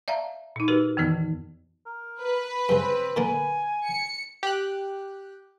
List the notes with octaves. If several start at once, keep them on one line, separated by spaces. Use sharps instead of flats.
D5 E5 F5 A5 A#5
A#2 D#4
D#4 F#4 G4 A#4 B4
F2 D#3 E3 B3
A#4
B4
G2 C#3 C4
A#2 D3 A#3 G#5
C#7
G4 F#6